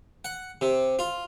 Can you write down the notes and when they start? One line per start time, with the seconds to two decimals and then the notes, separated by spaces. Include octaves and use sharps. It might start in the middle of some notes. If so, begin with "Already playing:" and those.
0.25 F#5
0.61 C3
0.99 F4